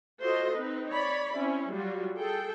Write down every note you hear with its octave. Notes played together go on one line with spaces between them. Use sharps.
F4 F#4 A4 C5 D#5
C4 D#4 B4
C#5 D5 B5
C4 C#4 E4
F#3 G3 F4 F#4
G#4 A4 G5